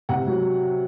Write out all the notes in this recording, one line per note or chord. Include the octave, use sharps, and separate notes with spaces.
C3 F#5
F#3